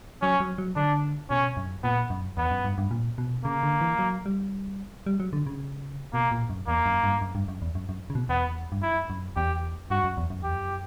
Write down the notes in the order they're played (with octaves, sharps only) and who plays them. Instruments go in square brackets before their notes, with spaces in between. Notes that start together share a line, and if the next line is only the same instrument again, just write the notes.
[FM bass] F#3 [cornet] C#4
[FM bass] F#3
F#3
[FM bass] D3 [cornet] D4
[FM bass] B2 [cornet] C#4
[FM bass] F#2
[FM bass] A#2 [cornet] B3
[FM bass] F#2
[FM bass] E2 [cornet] B3
[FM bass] F#2
G2
G2
A#2
B2
[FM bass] C#3 [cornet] A#3
[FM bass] D3
E3
F#3
G3
G3
F#3
D3
C#3
[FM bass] B2 [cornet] A#3
[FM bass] A#2
F#2
[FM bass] E2 [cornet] A#3
[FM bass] F#2
G2
F#2
G2
F#2
E2
F#2
F#2
C#3
B2
[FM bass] E2 [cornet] B3
[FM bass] G2
[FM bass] F#2 [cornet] E4
[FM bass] F#2
[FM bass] E2 [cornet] G4
[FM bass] G2 [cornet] F#4
[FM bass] F#2
E2
F#2
[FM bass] E2 [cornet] G4
[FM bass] F#2